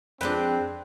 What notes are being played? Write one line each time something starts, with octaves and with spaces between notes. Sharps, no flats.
F2 G#3 C4 D4 B4 G5